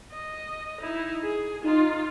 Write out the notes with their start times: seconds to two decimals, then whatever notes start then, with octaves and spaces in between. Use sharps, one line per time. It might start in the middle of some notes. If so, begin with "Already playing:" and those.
0.12 D#5
0.80 D#4 E4
1.23 G#4
1.65 D#4 F4